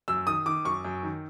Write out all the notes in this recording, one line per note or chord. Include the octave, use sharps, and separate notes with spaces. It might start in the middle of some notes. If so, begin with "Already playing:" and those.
F#2 E6
D#3 D#6
D#3 D6
F#2 C#6
F#2
D#3